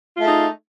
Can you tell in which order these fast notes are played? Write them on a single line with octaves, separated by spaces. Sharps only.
F4 A3 G#4 D#4